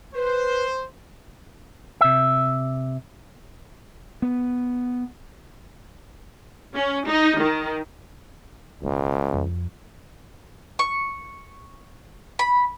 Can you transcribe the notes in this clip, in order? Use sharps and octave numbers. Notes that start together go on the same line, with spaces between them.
B4 C5
C3 E5
B3
C#4
D#4
D#3
E1 C#2
F2
C#6
B5